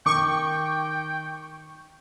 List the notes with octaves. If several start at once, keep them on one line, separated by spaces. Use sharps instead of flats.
D#3 G5 C#6 D6